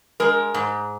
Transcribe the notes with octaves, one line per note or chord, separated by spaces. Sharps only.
G#3 A#4
G#2